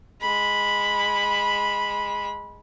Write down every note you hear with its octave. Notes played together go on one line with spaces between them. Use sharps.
G#3 B5